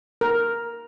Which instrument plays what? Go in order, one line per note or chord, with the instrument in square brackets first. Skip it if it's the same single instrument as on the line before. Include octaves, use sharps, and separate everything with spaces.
[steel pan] A#4